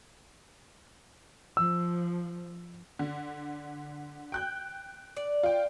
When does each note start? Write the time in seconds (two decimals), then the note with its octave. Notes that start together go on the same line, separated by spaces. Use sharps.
1.57 F3 E6
2.99 D3
4.32 G5 F#6 G6
5.16 D5
5.43 F4 G5